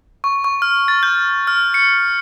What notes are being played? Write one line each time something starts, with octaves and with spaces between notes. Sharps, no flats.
C#6
C#6
F6
A6
G6
F6
C#7